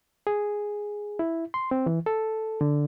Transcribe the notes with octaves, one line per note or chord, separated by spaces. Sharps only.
G#4
E4
C6
C4
E3
A4
D3